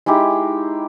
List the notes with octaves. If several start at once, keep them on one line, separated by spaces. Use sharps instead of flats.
G#3 D#4 E4 G4